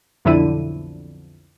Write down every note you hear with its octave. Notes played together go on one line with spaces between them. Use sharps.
B1 F2 D3 E4 D#7